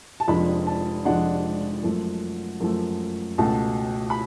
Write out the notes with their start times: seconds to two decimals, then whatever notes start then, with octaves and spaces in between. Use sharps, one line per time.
0.20 A5
0.28 F1 F2 F3 G#3 D4 B5
0.67 A5
1.05 F1 F2 F3 G#3 D4 F#5
1.83 F#2 F3 A3
2.60 F#2 F3 A3
3.38 C#2 B2 A3 A5
4.10 B5